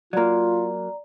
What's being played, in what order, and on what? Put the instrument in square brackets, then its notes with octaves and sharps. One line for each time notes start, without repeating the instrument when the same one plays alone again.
[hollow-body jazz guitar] F#3 A#3 [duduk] F4 [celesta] D5 A#5